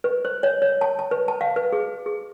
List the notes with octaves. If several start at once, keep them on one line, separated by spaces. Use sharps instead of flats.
B4
C5
C#5
C#5
A5
A5
B4
A5
F5
B4
G#4
G#4